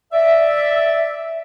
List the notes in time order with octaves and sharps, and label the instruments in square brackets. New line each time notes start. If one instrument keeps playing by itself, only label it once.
[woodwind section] D5 E5